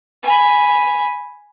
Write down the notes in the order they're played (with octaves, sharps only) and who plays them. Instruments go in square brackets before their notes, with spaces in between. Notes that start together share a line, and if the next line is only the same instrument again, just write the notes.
[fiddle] G#5 B5